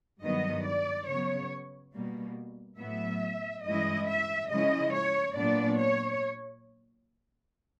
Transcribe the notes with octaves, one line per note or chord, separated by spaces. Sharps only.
G2 D#3 F#3 B3 D#5
D5
C#3 F#3 B3 C#5
B2 G3 A#3
A2 F#3 B3 E5
G2 E3 G#3 C#4 E4 D#5
E5
C#3 F3 G#3 C#4 E4 D#5
C#5
A#2 F#3 B3 D4 D5
C#5